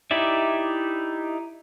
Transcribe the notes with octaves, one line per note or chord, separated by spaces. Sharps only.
D#4 E4 G4 D5 E5